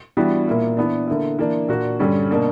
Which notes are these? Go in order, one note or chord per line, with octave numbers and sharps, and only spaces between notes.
E3 G3 B3 D4 F#4
A#2 A#3 E4
E3 B3 D4
D3 A#3 E4
E3 A#3 D4
A#2 A#3 D4 F#4
G2 D3 G3 C#4
B2 A#3 D4